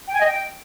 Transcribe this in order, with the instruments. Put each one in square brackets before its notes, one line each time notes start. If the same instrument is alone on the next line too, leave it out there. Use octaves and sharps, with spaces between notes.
[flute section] G5
G#5
D#5
G5